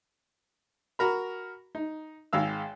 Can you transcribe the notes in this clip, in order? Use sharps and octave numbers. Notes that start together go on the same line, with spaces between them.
F#4 A#4 B5
D#4
G#1 G#3 F5 E6